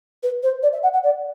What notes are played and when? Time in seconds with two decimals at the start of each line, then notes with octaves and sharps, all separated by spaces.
0.23 B4
0.43 C5
0.63 D5
0.73 E5
0.83 F#5
0.93 F#5
1.04 D5